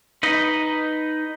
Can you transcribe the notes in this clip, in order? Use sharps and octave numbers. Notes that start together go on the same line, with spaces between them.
D#4 B4 D#5